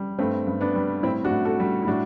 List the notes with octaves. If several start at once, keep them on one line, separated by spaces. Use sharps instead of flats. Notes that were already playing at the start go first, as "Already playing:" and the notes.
Already playing: G3
G2 A3 C4
G2
B3 D4
G3
A2 C4 E4
D4 F#4
A2
F#4 A4
G3
E4
A2 D4 F#4